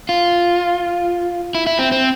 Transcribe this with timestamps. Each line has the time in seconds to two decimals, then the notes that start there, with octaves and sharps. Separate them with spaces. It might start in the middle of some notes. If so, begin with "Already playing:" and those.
0.09 F4
1.55 E4
1.67 E4
1.79 C4
1.92 C4